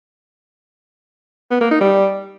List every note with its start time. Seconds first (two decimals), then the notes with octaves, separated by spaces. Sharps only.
1.51 B3
1.61 A#3
1.71 D#4
1.81 G3